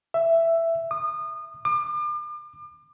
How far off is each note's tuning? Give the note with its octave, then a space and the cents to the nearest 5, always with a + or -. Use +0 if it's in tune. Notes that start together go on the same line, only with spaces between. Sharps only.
E5 +10
D#6 -30
D6 +40